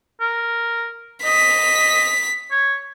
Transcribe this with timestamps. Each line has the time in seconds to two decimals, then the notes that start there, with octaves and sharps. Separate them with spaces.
0.20 A#4
1.24 D#5 B6
2.51 C#5